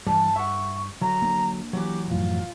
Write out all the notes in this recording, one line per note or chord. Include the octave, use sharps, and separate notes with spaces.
G2 E3 G3 A5
E5 F#5 C#6
D3 F#3 A#5
A#3 D4
E3 F#3 G4
F#2 A2 F3 F4